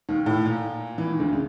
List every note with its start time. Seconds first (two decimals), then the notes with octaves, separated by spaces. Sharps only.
0.09 D#2 D#3
0.26 A2
0.45 A#2
0.98 E3
1.09 D#3
1.20 D2 D3
1.33 C#3